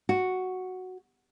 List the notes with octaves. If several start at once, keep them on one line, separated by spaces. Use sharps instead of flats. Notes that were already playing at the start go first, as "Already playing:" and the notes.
F#4